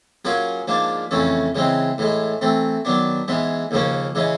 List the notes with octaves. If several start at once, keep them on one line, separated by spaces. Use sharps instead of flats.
F#3 A#3 C#4 F4 G#4
G#2 F3 A#3 D4
F2 C#3 E3 A3 C#4
C#3 E3 G#3 C4
A2 E3 G#3
E3 A3 C4
D#3 F#3 B3 D4
G#2 E3 G#3 B3
D#2 C#3 F3 A#3 C#4
C#3 E3 G#3 C#4